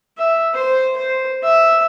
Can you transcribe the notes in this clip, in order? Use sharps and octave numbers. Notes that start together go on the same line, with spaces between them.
E5
C5
C5
E5